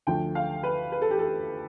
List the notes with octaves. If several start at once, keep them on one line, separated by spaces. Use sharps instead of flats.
D2 D3 F3 G5
F5
B4
B4
A4
G4
A4